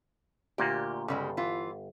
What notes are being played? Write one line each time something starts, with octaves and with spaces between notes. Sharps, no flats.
D2 A#2 A#3 G4
G1 C#3 G3 G#3
E3 F4